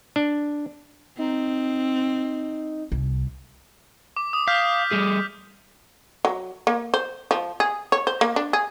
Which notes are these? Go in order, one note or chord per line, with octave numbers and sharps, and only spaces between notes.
D4
C4 D#4
C2
D6
D#6
F5 F6 G6 B6
G3 A3 G#4
F#3
A#3
C5
F3
G#4
C#5
C5
A#3
D4
G#4